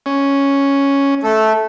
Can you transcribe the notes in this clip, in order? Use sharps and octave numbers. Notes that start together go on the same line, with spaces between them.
C#4
A3 A4